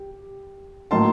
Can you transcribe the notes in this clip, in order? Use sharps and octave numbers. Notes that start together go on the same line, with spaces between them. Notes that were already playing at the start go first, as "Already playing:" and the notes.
Already playing: G4
A2 F#3 A#3 D#4 A5 C6